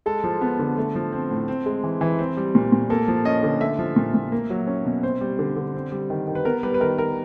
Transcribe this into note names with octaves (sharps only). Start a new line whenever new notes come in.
G#3 A4
F3
B3
D3
A3
F3
C4
A2
C4
G#3
E3
E3
C4
G3
A#2
A#2
A#3 A4
F3
C#4 D#5
D3
A3 E5
F3
A#2
A#2
A#3
F#3
C#4
B2
C4 C5
G3
D3
D3
C4
G3
D#3
D#3
B4
B3 A#4
G3 B4
B4
D#3 A#4
D#3 A#4